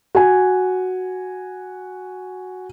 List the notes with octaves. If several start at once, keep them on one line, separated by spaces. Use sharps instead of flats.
F#4 G#5